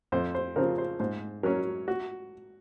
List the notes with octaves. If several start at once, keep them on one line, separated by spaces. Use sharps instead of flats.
F2 C5
C5
C#3 F3 C4 A#4
C5
G#2 C5
F#3 C#4 A#4
F#4